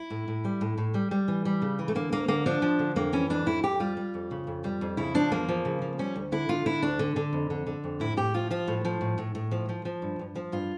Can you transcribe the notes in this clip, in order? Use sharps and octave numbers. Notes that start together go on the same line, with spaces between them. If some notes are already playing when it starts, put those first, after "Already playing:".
Already playing: E4
A2
A2
G3
A2
A2
G3
G3
E3
G3
C#3
E3
A3
D3 A#3
D2 A#3
D3 A#3
F3 D4
F3
D3
F2 A#3
E3 C#4
F2 D4
F2 E4
F2 G4
G3 F4
G3
F2
C#3
F2
G3
F2
C#3 E4
F3 D4
E2 A#3
F3
C#3
F3
G3 C#4
D2
D3 E4
D3 F4
D3 E4
D2 D4
D3
D3
F2
D3
D3
F2
A2 E4
A2 G4
F3 F4
F3 F4
A2
F3
A2
A2
A2
F3
F3
F3
G2
G2
F3
G2 F4